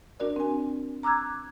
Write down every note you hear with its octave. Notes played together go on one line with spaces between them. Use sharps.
D4 F#4 A#4 D5
C4 G#5
A#5 D6 E6 F#6 G#6